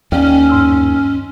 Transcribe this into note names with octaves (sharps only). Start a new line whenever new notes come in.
D#2 C#4 D5 G5 F6
G2 C6 E6